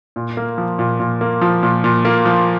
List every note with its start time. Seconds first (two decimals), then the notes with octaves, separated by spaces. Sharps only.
0.16 A#2
0.37 A#3
0.58 F3
0.79 A#2
1.00 A#2
1.21 A#3
1.42 F3
1.63 A#2
1.84 A#2
2.05 A#3
2.25 F3